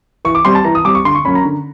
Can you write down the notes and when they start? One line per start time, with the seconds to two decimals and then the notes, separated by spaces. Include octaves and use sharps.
0.25 E3 C#6
0.35 D6
0.45 G3 C4 C6
0.55 A5
0.65 E3 A#5
0.75 D#6
0.85 G3 C4 D6
0.95 C#6
1.05 D3 C6
1.15 C#6
1.25 F#3 A#3 C#4 B5
1.35 A#5
1.45 D3